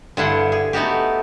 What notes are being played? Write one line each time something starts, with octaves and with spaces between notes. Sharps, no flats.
G2 D3 E4 F#5 C6
G#4
A3 B3 D#4 F#4 G4